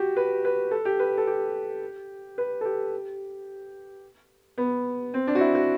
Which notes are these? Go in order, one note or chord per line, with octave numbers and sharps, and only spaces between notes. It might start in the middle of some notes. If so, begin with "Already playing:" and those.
Already playing: F#4 G4
B4
B4
A4
G4
B4
A4
G4
B4
A4
G4
B3
C4
D4
F#4
E4
F#4